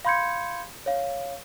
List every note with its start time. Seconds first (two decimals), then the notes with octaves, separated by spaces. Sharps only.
0.05 F5 B5 C6 G6 G#6 C#7
0.86 C#5 F5